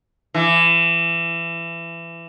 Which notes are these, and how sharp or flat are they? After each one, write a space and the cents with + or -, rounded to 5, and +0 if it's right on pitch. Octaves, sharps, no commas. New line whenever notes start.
E3 +25